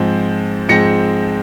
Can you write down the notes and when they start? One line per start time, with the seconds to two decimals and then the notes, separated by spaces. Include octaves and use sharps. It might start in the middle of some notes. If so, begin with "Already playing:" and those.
Already playing: G#2 F3 G#3 C4
0.69 G#2 F3 G#3 C4 A#6 C#7